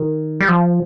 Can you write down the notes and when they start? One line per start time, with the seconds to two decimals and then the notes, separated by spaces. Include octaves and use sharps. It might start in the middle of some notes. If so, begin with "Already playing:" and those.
Already playing: D#3
0.40 G3
0.48 F3